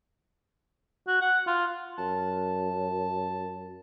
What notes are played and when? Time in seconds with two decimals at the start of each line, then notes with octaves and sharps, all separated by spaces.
1.08 F#4
1.22 F#5
1.47 F4
1.98 F#2 A5